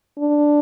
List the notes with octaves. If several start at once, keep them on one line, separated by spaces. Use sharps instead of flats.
D4